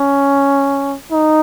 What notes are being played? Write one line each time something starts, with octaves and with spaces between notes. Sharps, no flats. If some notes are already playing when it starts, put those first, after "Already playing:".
Already playing: C#4
D#4